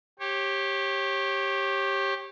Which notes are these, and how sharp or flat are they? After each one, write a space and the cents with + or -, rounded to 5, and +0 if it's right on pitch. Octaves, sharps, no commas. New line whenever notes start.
G4 +0 C#5 -30